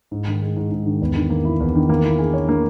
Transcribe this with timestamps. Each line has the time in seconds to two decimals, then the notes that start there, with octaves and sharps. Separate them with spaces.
0.11 G#2
0.27 D#3
0.42 G#3
0.56 G#2
0.71 G#2
0.86 D#3
1.01 E2
1.16 D#3
1.30 A#3
1.45 E4
1.60 E2
1.75 D#3
1.89 A#3
2.04 E4
2.19 G#4
2.33 C#5
2.49 A#3